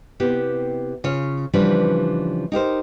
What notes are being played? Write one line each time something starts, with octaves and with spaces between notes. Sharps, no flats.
C3 B3 E4 G4
C#3 F4 C#5
C#3 E3 F3 G3 D4 B4
D#4 G4 A#4 C5